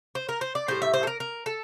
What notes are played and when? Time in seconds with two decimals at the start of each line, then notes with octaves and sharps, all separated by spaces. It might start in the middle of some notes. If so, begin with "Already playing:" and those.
0.15 C5
0.29 A#4
0.41 C5
0.55 D5
0.68 A2 G3 C5
0.82 E5
0.94 C5
1.03 A4
1.07 A#4
1.20 A#4
1.46 A4